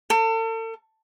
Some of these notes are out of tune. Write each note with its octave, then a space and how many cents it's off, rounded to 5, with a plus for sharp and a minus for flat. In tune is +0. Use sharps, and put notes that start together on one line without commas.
A4 +40